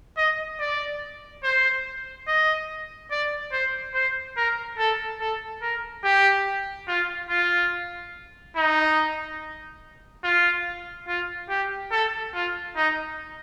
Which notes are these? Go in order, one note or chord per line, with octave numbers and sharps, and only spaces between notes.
D#5
D5
C5
D#5
D5
C5
C5
A#4
A4
A4
A#4
G4
F4
F4
D#4
F4
F4
G4
A4
F4
D#4